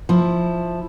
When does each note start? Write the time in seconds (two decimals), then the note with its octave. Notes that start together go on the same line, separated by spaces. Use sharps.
0.09 F3 E4